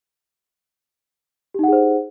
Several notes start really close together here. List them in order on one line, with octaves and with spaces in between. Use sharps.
G4 D#4 F#5 G#4 C5